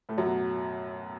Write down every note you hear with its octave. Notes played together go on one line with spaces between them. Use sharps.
A2 A3
F#2 F#3
B2